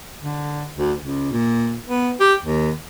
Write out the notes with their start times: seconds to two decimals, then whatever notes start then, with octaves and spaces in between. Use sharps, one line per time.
0.20 D3
0.77 D2
1.01 C#2
1.32 A#2
1.88 B3
2.20 G4
2.40 D#2